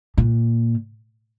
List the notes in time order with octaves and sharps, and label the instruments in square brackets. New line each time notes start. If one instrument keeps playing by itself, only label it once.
[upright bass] A#2